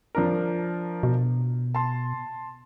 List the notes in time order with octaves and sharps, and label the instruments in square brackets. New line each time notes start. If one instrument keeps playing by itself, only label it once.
[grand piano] F3 D4 A#4
[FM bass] B2
[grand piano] A5 C6